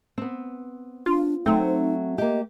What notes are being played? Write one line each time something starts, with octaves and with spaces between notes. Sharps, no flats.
B3 C4
D4 F4
F#3 A3 C4 D#4
A#3 G4 D#5